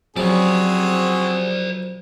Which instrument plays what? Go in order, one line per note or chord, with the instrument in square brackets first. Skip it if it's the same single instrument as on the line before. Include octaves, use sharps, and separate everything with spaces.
[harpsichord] F#2 C#3 F3 [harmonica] C4 F#4 G#4 [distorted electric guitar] C5 D5